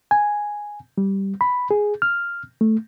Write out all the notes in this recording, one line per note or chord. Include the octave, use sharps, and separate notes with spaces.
G#5
G3
B5
G#4
F6
A3